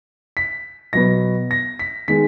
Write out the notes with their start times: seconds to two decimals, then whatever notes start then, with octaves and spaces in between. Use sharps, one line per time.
0.37 B6
0.93 B2 F#3 B3 A#6
1.51 A#6
1.79 B6
2.08 D#3 G#3 B3 B6